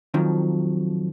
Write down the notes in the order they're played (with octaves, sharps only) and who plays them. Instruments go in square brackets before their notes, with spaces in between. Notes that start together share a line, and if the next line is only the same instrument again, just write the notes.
[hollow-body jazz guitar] F2 D#3 F3 F#3